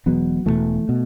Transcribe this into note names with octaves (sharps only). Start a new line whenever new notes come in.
E1 E2 B2 F#3 B3
E1 E2 B2 E3 A3
B2